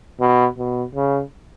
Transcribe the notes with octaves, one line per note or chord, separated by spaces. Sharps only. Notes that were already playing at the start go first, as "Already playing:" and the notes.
B2
B2
C#3